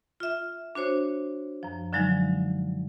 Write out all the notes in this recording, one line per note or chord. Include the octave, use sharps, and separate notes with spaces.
F4 E5
D4 F#4 C5 C#5
F#2 F3
D3 F3 F#3 G#3 D#4